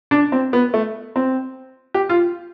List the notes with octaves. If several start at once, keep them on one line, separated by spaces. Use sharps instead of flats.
D4
C4
B3
A3
C4
G4
F4